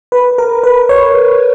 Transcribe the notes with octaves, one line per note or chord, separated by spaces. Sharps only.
B4
A#4
B4
C#5